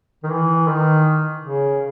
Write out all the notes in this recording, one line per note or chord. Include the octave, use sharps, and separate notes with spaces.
D#3
E3
D#3
C#3